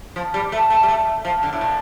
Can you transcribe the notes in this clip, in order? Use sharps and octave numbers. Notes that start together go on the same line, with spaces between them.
F3
G3
A3
A3
G3
A3
F3
D3
A2
A#2